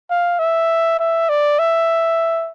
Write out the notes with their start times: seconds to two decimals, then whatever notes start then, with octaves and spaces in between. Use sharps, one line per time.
0.10 F5
0.39 E5
0.99 E5
1.29 D5
1.59 E5